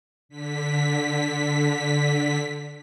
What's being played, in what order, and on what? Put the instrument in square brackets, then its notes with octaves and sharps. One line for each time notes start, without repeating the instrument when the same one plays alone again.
[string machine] D3 B6